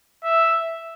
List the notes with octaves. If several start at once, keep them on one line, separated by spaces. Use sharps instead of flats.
E5